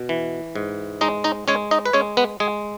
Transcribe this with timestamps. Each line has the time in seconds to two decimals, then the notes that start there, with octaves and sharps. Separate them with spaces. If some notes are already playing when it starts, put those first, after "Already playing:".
Already playing: B2
0.09 E3
0.56 G#2
1.01 G#3 D#4 D#5
1.24 D#4 D#5
1.48 G#3 C#4 C#5
1.71 D#4 D#5
1.86 B4
1.93 G#3 C#4 C#5
2.17 B3 B4
2.40 G#3 G#4